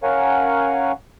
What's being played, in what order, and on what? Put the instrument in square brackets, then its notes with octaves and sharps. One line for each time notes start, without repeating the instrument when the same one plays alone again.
[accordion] C#4 A#4 C#5 F5 F#5 G#5